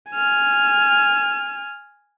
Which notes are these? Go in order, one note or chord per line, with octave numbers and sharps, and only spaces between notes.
G#5 F6